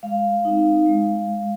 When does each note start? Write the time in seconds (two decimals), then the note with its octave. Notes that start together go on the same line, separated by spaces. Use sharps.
0.03 G#3 F5
0.45 C4 D#4
0.86 G#3